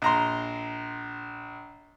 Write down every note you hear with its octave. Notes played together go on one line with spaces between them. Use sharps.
A#1 A#5 C6